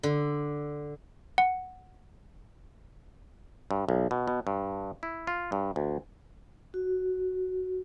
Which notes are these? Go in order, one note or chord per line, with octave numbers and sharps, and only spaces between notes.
D3
F#5
G2
B1
B2
B2
G2
E4
F4
G2
D2
F#4